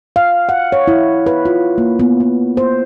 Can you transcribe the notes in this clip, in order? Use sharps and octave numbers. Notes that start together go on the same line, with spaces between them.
F5
F#5
C#5
E4
B4
F4
A#3
B3
B3
C5